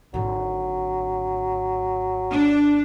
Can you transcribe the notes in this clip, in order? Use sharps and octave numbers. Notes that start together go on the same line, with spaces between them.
G#1 D3 F#3
D4